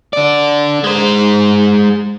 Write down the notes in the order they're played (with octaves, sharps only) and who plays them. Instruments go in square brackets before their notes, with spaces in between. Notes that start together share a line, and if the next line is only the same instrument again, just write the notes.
[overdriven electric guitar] D3 D5
G#3 C5